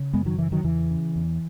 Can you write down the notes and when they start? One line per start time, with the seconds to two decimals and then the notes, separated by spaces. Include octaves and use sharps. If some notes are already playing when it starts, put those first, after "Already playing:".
Already playing: C#3
0.13 F#2 G#3 B3
0.26 D#3 F#3
0.38 C#3 E3
0.52 D#3 F#3
0.64 E2 E3
0.90 C#3
1.16 E2